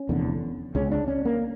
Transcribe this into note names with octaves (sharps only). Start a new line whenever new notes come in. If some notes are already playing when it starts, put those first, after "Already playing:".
Already playing: C#4
F1 E2 D3
C#2 C#3 C#4
D4
C#4
A#3